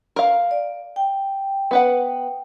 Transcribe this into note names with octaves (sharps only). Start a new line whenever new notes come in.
A#4 F5
D5
G5
B3 B4 F#5